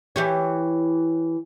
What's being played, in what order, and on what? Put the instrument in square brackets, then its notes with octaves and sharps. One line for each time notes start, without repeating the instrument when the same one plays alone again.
[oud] E3 G4 C#5